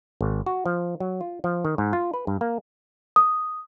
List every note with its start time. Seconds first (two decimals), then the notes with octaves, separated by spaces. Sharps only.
0.21 G#1
0.46 F#4
0.66 F3
1.00 F#3
1.21 F4
1.44 F3
1.65 D#3
1.78 G#2
1.93 F4
2.14 B4
2.27 G2
2.41 A#3
3.16 D#6